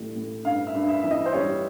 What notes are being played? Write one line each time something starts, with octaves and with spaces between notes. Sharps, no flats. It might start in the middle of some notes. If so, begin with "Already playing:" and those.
Already playing: A2 E3 G3
A2
G2 F5
E5
G2
E5
E3 E5
D#5
C5
G3 C#5